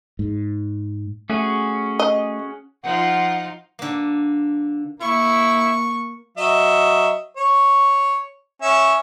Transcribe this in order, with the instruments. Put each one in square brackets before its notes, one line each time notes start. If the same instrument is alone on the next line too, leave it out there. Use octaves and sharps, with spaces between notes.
[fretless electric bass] G#2
[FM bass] A3 [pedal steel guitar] C#4 F#4 G#4
[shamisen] D#5
[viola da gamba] F3 D#4 F4 [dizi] F#5
[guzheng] D3 A#3
[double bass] A#3 [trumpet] E4 [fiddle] C#6
[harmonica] F#3 D#5 E5
C#5
C#4 E5